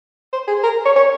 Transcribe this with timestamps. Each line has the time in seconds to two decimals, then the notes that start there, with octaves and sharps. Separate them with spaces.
0.33 C5
0.48 G#4
0.63 A#4
0.85 C#5
0.96 C#5